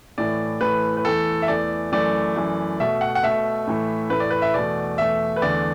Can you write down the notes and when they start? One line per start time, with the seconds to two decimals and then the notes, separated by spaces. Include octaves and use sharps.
0.18 A2 E3 A3 D5
0.61 A2 E3 A3 B4
0.97 B4
1.05 E2 E3 A3 A4
1.42 E5
1.48 E2 E3 A3 D5
1.92 F#2 E3 A3 D5
2.36 F#2 E3 A3
2.80 B2 A3 E5
3.01 F#5
3.15 F#5
3.23 B2 A3 E5
3.67 A2 E3 A3
4.10 A2 E3 A3 B4
4.20 D5
4.31 B4
4.42 E5
4.54 E2 B2 A3 D5
4.97 E2 B2 A3 E5
5.36 B4
5.42 E2 D3 A3 D5